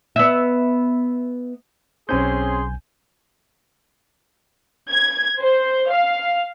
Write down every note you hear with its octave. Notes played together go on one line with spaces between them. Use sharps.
B3 E5
B1 C4 C#4 G#4 G#5 C6 G6
G#6
C5
F5